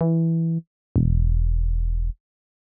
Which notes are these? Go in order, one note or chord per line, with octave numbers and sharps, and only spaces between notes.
E3
E1